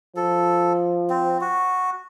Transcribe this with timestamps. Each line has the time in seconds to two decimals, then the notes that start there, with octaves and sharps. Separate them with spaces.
0.16 F3 A4
1.10 C4
1.41 F#4